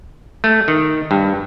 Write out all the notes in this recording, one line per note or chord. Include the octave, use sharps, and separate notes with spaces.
A3
D#3
G2